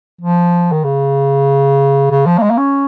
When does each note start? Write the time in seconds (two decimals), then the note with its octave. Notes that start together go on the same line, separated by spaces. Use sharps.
0.21 F3
0.72 D#3
0.84 C#3
2.11 C#3
2.26 F3
2.38 A#3
2.42 G#3
2.50 A#3
2.58 C#4